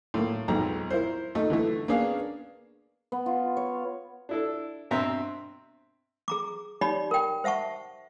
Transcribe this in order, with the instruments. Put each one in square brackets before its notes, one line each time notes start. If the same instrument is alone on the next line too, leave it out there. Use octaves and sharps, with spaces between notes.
[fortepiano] A2 A#3
B1 F2 G#2 A#5
E4 A#4 C5
A3 D#4
D3 E3 A3
A#3 B3 C#4 D4 G#4 F5
[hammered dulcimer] B3
F4
C#5
[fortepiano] D4 E4 A4
G2 B2 C4 E5 A#5
[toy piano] G#4 A#5 D6
D#4 G4 C#5 D5 B5
A#4 G5
C5 E5 F#5 A5 C#6